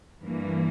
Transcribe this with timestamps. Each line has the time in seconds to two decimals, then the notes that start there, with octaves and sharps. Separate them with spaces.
0.21 G2 E3 A#3